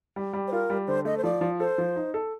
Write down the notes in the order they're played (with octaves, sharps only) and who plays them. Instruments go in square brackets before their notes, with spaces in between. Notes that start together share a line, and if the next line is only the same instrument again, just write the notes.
[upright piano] G3
G3
[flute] C5
[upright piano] F4 [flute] A#4
[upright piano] G3
[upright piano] D3 [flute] C5
[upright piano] A3 [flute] D#5
[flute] C5
[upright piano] F3 [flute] D5
[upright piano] F3
[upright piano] A4 [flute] C5
[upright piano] F3
D#4
A4